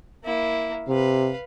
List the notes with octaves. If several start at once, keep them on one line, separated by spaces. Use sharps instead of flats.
A#3 E4
C3 B4 F5